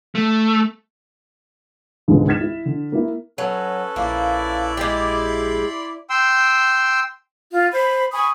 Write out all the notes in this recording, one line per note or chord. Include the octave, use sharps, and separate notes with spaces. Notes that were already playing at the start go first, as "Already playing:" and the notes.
A3
E1 C#2 G#2 D3 D#3
F6 G#6 A6 B6 E7
E4
D3
A#3 E4
F#3 C#4 A4 B4
A#1 A#3 E4 D5
G#3 G4 B5 C6
G5 C6 E6
F4
C5 B5
G#5 B5 C#6 D#6